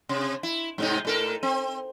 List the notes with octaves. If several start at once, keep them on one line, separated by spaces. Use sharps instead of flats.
C3
E4
G#2 C3 D#4
A2 A4 A#4
C4